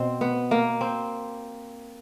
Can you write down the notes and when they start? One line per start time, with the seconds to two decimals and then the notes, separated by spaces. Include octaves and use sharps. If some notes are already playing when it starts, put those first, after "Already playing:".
Already playing: B2 C4
0.21 B3
0.51 A#3
0.81 C4